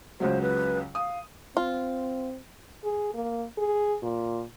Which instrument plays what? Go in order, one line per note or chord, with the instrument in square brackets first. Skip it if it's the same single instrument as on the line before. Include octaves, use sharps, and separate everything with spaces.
[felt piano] C#2 C#3 F#3 [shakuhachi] C5
[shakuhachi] B4
[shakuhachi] F5 [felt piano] D#6
[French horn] C4 [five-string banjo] F4
[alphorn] G#4
A#3
G#4
A#2